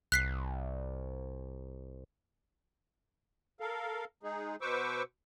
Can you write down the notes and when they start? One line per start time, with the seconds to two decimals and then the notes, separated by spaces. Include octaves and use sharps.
0.12 C2 F#6 B6 C7
3.60 A4 A#4 F5
4.23 G#3 D#4 G#4
4.61 B2 B4 C5 C#6 D6 E6